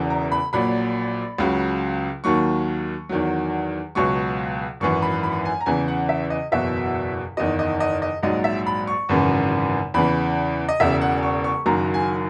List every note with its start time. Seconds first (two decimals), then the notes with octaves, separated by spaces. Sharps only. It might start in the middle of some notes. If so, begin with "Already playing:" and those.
Already playing: E1 E2 C#3 E3
0.10 A#5
0.32 B5
0.53 A#1 A#2 F#3 B5
1.38 C#2 C#3 F#3
2.24 D#2 D#3 F#3 C#6
3.09 E2 D#3 F#3
3.95 C#2 B2 F#3 C#6
4.80 G#1 F#2 E3 C#6
5.02 B5
5.23 B5
5.45 G#5
5.61 A#5
5.66 E2 C#3 E3 G#5
5.88 F#5
6.09 E5
6.30 D#5
6.52 F#1 E2 B2 F#3 E5
7.37 F#1 E2 D#3 D#5
7.59 D#5
7.80 D#5
8.02 D#5
8.23 A#1 G#2 F#3 D#5
8.44 E5
8.67 B5
8.87 C#6
9.09 G#1 F#2 C#3 E3
9.94 E2 C#3 E3 B5
10.69 D#5
10.80 E1 E2 C#3 E5
11.01 F#5
11.23 C#6
11.44 C#6
11.66 F#1 F#2 D#3 F#3 A#5
11.94 G#5